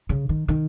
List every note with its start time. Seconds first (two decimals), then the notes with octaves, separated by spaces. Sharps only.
0.09 C#3
0.29 D#3
0.48 D#3